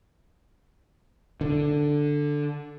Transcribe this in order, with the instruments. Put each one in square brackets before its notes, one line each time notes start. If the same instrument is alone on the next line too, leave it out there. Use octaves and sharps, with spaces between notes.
[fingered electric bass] D3